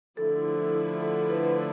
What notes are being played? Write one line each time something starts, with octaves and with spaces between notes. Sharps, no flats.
D3 F3 A3 E4 A4
A4
B4